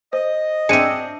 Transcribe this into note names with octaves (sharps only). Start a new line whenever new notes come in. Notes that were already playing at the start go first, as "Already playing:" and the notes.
C5 D#5
C4 D4 G#4 E5 C#7 D#7